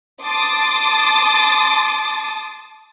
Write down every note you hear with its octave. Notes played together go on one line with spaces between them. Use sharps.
A5 C6 D6 D#6 A6